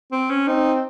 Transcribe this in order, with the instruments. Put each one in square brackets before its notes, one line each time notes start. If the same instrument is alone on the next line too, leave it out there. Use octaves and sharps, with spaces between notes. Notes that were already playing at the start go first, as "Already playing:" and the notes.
[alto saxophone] C4
C#4
[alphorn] C4 [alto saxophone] D#4